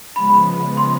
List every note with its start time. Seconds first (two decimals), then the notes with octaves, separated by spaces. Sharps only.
0.16 C#3 F3 G#3 B3 B5
0.77 C6